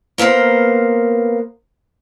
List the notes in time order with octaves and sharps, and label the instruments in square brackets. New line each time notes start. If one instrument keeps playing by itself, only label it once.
[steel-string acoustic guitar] A#3 B3 A#4 C5